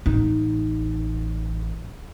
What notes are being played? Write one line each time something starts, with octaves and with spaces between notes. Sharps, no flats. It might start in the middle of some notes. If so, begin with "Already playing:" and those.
A1 D#4